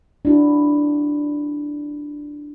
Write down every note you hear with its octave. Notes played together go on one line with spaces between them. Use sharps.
D4 E4 F#4